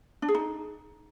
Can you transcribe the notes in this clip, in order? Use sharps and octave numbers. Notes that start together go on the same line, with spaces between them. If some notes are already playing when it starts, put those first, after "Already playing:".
D4
G#4
D#4